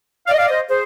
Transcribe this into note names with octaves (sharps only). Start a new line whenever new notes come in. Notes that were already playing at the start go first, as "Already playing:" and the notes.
D5 F5
D#5
D5 F5
C5 D#5
G#4 C5